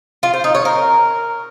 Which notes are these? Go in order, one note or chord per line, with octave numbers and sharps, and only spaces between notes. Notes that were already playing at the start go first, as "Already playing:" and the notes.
F4
C5
D#4
C#5
A#4